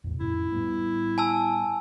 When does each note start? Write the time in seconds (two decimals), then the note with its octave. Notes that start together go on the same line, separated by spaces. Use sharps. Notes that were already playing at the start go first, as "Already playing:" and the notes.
0.04 E2 A2 C3
0.20 F2 A2 C#4 E4
0.53 A2 G3 B3
1.18 G#5 A5 E6